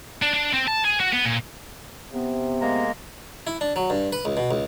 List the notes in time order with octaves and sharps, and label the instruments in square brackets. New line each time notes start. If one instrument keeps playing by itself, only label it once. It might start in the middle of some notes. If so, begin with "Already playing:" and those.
[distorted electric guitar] D4
D4
C4
A5
G#4
F#4
B3
A#2
[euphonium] C3 [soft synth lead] B3
[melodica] G#3 A#3 A#5
[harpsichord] E4
D4
F#3
G2
B4
C#2
B2
C#2